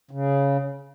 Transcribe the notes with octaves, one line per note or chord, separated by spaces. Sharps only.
C#3